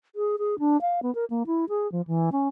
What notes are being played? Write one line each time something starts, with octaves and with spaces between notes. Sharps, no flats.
G#4
G#4
D4
F5
B3
A#4
A#3
E4
G#4
F3
E3
C#4